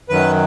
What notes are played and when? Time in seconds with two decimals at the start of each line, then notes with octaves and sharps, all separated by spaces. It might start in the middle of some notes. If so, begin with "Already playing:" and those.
0.09 F#2 D#3 F#3 B4